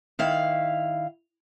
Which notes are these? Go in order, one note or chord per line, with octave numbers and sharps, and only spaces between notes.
D#3 E4 F5